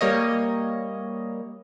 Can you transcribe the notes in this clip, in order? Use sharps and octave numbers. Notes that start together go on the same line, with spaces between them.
G3 A#3 C#5 D#5